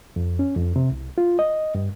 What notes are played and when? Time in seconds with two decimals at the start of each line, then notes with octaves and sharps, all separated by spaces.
0.16 F2
0.39 C#4
0.56 F2
0.76 C3
0.91 C2
1.18 F4
1.39 D#5
1.75 G2